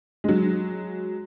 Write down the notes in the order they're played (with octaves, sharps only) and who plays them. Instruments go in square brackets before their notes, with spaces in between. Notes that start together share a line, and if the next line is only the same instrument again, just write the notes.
[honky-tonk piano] F#3 G#3